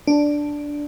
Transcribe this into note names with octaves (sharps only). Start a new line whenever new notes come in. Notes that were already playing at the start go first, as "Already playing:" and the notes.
D4